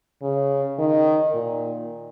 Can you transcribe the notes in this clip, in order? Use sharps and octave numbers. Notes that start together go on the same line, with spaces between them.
C#3
D#3
A#2